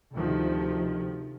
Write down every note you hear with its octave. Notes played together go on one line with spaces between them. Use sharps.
D2 C3 D#3 F3